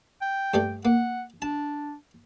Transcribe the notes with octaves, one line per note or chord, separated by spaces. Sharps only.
G5
G2 G3 A3
A#3 F#5
D4 A5